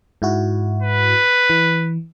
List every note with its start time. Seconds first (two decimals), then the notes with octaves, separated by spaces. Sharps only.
0.22 G#2 E4 F#4
0.82 B4
1.50 E3